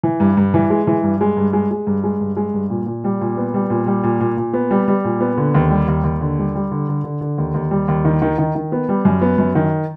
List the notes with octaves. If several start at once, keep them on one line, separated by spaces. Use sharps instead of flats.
E3
G2
G2
E3
G#3
E3
G2
G#3
G2
G#3
G#3
G2
G#3
G2
G#3
G2
A#2
A#2
G3
A#2
B3
G3
A#2
G3
A#2
A#2
A#2
B3
G3
G3
A#2
B3
D3
D#2
G3
D#2
D#2
D3
G3
G3
D3
D3
D3
D3
D#2
D#2
G3
D#2
D#3
D#3
D#3
D#3
B3
G3
F#2
B3
F#2
D#3